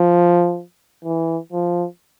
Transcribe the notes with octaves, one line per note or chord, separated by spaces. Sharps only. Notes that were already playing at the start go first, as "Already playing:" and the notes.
Already playing: F3
E3
F3